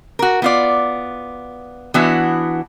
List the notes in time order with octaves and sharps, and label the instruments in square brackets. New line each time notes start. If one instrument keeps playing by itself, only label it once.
[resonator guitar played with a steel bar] F#4 A#4
B3 F4 D5
E3 B3 D4 E4 F#4